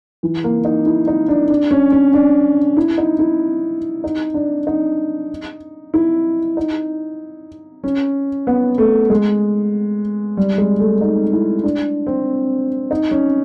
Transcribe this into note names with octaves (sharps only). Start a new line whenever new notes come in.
E3
A#3
D#4
E4
D#4
D4
D4
C#4
C#4
D4
E4
D#4
E4
D#4
D4
D#4
E4
D#4
C#4
B3
A3
G#3
G3
G#3
A3
D#4
E4
D4
C4
D#4
C#4